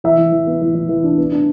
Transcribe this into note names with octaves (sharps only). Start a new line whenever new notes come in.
E3 E5
E3
E3
B3
E3
E3
E3
D4
B3
D4